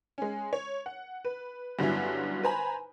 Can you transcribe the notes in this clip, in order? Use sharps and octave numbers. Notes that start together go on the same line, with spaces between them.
G#3 C#4
C#5
F#5
B4
G2 D3 F#3 B3 C#4 E4
B4 C5 G#5 A#5 B5